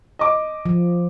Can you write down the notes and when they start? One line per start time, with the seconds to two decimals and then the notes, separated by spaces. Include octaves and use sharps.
0.19 D#5 D6
0.66 F3